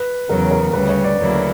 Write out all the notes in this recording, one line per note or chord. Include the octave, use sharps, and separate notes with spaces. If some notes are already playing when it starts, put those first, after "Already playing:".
Already playing: B4
E2 C#3 F#3 A#4
A#4
D2 C#3 G3 B4
C#5
D5
D2 C#3 F#3 A#3 E4